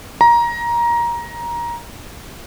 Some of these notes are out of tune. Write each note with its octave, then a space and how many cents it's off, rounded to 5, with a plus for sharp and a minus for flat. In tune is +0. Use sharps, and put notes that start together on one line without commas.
A#5 +15